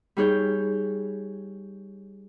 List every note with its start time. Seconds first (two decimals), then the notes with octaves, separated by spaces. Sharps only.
0.17 G3 D#4 G#4 C#5 G6